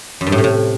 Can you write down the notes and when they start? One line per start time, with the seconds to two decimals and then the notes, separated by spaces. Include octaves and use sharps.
0.21 F#2
0.27 G2
0.32 A2
0.38 C3
0.44 A2